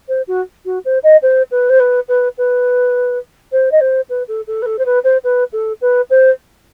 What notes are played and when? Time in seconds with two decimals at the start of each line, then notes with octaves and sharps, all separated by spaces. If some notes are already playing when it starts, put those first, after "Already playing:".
0.08 C5
0.27 F#4
0.65 F#4
0.85 C5
1.03 D#5
1.22 C5
1.51 B4
1.69 C5
1.79 B4
2.08 B4
2.37 B4
3.52 C5
3.71 D#5
3.80 C5
4.09 B4
4.28 A4
4.47 A4
4.62 B4
4.66 A4
4.78 C5
4.85 B4
5.04 C5
5.24 B4
5.52 A4
5.81 B4
6.10 C5